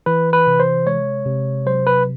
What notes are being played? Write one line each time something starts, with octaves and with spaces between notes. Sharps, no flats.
E3 B4
B4
C3
C5
G#3 C#5
C3
F#3 C5
B4